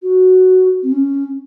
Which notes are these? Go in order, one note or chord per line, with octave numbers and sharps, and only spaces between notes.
F#4
C4
C#4